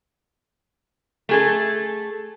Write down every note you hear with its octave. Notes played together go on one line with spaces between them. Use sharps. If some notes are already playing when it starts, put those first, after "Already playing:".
A3 G#4 A4